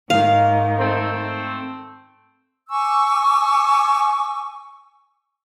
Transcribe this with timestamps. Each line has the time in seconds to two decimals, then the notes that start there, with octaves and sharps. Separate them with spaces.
0.10 G#2 D#3 F5
0.78 A3 C4
2.70 G#5 C#6 D6 E6